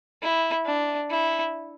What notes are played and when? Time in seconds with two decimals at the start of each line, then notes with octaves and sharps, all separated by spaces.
0.22 E4
0.66 D4
1.10 E4